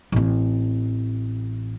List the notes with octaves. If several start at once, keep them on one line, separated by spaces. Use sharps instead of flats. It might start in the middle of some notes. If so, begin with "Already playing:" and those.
A1 C4